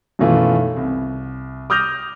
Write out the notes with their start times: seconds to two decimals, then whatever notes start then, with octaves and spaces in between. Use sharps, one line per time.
0.19 F#2 B2 D#3 E3 A3 F4
0.77 C2
1.70 D6 D#6 F6 G6 A#6 F7